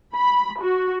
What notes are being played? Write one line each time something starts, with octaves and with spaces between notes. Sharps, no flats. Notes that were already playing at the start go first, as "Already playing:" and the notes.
B5
F#4